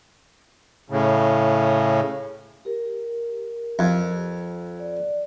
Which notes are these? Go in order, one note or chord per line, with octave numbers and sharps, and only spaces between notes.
A2 C#3
G4 A#4
F2
D5